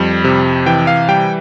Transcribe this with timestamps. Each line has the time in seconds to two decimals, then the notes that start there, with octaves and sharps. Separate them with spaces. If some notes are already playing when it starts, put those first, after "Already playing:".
Already playing: F2 G3
0.24 C3
0.66 E3 G5
0.87 F5
1.08 G3 G5